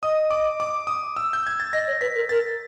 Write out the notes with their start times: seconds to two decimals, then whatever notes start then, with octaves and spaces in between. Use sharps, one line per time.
0.03 D#5 D#6
0.30 D6
0.60 D6
0.87 D#6
1.17 E6
1.33 G6
1.47 G#6
1.60 A6
1.73 D#5 A#6
1.87 C#5
2.01 B4 B6
2.15 A#4
2.29 A#4 A6